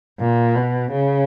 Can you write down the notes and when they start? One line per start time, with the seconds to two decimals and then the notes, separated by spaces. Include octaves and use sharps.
0.20 A#2
0.56 B2
0.92 C#3